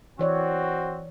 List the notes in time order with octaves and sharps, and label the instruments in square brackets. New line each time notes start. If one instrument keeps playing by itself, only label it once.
[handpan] E3 C#5 D5 [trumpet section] C4 F#4